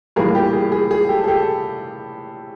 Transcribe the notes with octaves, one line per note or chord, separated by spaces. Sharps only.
A#1 A2 E3 G3 A#3 G#4 A#4
G4
G#4
G#4
G#4
G4 A4
G#4
G4 A4